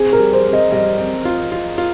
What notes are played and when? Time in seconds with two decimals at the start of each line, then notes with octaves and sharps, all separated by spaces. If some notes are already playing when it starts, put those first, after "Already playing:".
Already playing: C4 G#4
0.13 A#4
0.19 G3
0.33 C5
0.46 C4
0.53 D#5
0.72 G3 D#5
0.98 C4
1.25 F4
1.52 F4
1.78 F4